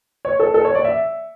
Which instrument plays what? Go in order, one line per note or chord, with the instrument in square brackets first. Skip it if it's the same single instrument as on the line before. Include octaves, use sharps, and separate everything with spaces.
[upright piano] C#5
A4
A4
C#5
D5
E5